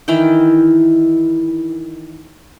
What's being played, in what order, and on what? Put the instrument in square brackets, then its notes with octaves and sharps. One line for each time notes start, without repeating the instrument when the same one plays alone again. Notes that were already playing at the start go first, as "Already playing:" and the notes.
[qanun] D#3 E3 E4 G5